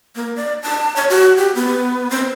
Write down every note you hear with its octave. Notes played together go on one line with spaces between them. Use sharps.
A#3
D5
A5
C#5
F#4
G4
B3
C4